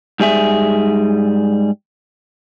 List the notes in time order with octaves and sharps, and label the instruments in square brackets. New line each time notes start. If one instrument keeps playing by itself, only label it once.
[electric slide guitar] G#2 G3 G#4 E5